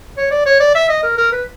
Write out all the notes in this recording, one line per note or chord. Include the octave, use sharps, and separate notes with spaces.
C#5
D5
C#5
D5
E5
D#5
A#4
A#4
B4